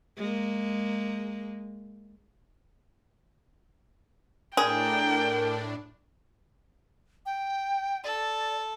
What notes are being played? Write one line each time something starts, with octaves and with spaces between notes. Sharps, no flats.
G#3 A#3
A2 D4 G#4 A#4 G5
G5
A4 D5